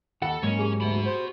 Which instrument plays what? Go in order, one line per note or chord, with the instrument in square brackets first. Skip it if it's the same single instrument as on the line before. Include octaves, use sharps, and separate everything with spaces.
[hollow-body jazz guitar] D#2 F#5 [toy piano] F4 [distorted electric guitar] A4
[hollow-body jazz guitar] G#2 F#3 A#3 [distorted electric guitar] C#4 C#5
[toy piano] G4 G#4 G#5
[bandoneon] D2 [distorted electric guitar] F#4 B5
[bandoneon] C5